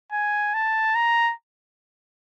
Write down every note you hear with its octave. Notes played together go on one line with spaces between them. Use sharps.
G#5
A5
A#5